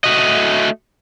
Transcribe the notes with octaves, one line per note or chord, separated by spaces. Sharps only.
A3 F#4 D#5